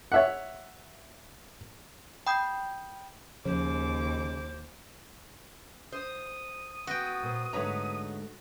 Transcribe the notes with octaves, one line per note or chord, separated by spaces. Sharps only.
C#5 E5 F#5
G5 B5 D#6 G6
D#2 C#3 F3 C5 D6
C5 D#6
B3 F#4 G5
A#2 C5
G#2 D3 A3 B4 C#5 A#5